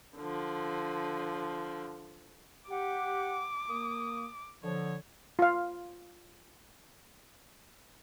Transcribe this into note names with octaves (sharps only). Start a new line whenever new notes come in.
D3 F3
G4 F#5 D6
A#3 D#6
D3 F3 C#5
F4 F5